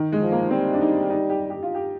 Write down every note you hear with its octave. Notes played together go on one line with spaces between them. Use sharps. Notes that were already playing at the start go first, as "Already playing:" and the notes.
Already playing: D#3
G#3
F3
A#3
G3 C4
D4
D#4
D#4
G4
G4
F4
G4